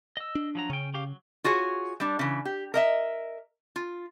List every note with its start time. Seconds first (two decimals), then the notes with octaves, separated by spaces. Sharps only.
0.17 D#5 E6
0.35 D4
0.55 F3 F#3 A#5
0.70 C#3 C#4 G5
0.94 C#4 G4 F5
1.07 F#3
1.44 F4 F#4 G#4 C#5
2.00 G3 D4
2.19 C#3 E3
2.45 G4
2.74 A#4 D#5 E5
3.76 F4